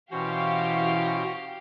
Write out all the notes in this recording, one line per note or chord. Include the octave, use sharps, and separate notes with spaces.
B2 E3 C#4 F#4 G4 C5 F5